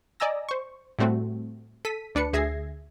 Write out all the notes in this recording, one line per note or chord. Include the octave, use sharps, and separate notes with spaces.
D5 D#5 G#5 A#5 E6 A#6
C5 C#6
A2 G3 A3 C4 F#4
A4 B6 D#7
D2 D4 B4 C#7
D2 G#4 E5 G#6 A#6 C7